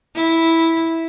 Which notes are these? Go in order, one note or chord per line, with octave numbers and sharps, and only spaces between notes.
E4